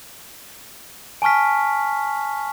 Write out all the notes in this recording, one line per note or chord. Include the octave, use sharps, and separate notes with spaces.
G#5 A5 C#6 F6 B6